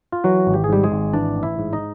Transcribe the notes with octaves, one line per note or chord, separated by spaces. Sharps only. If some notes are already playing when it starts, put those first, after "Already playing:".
F4
E3 F#3 F#4
G#1
G4
G#4
G#2 G3 G4
G#3 G#4
G#1
E3 D4 D5
A1
E4 E5
G#2
D#4 D#5